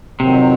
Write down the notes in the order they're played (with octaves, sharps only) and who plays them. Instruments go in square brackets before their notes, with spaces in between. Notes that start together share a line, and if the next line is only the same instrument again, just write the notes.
[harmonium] F2 D#3 F#3 C4 [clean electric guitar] C3